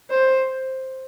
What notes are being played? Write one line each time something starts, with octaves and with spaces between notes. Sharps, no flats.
C5